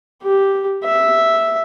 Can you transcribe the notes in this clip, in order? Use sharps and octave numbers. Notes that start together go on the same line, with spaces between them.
G4
E5